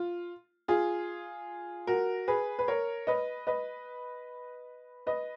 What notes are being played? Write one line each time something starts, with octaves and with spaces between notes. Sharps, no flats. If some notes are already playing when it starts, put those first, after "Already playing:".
Already playing: F4
F4 G#4
F#4 A#4
G#4 B4
B4
A#4 C#5
B4 D#5
B4 D#5
B4 D#5